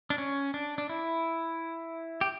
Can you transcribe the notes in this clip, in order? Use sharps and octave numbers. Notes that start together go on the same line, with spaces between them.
D4
C#4
D4
D4
E4
G4